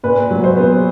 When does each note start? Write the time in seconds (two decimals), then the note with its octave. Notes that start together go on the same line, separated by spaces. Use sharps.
0.04 A#2 B4
0.31 F#3
0.44 C5
0.57 B3